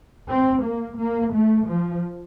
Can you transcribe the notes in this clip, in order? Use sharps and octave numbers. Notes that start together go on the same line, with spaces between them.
C4
A#3
A#3
A3
F3